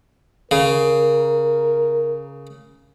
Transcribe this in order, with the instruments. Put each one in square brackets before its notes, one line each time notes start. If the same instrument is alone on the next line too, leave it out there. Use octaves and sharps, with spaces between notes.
[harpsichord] C#3 [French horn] A#4